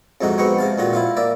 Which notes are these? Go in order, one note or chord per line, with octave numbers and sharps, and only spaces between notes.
F2 G#2 C3 D#4 F#4
G#3 B3 C4 D#4 F#4 C#6
C3 F5 A5
A#2 D#3 F4 F#4
E4 F4 F5
A#3 D5 E5